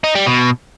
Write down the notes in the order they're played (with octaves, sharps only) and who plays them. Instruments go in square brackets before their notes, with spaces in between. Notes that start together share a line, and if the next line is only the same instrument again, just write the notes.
[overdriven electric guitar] D#4
G3
B2